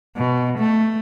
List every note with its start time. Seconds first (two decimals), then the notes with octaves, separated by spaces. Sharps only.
0.17 B2
0.59 A3